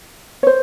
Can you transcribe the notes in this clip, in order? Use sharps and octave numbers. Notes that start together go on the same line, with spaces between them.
C#5
C5